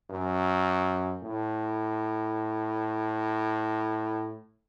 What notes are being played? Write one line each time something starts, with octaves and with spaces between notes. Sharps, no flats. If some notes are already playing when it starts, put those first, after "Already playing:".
F#2
A2